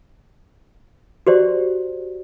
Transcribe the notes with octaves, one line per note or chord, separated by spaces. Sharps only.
F#4 G4 C5 D5